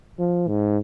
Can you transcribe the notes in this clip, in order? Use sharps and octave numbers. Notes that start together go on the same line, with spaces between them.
F3
G#2